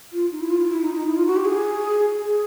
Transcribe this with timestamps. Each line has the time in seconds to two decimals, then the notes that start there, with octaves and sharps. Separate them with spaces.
0.12 F4
0.32 D#4
0.41 E4
0.50 F4
0.60 F4
0.70 E4
0.82 D#4
0.94 D#4
1.07 E4
1.16 F4
1.27 F#4
1.36 G4
1.45 G#4
2.21 G#4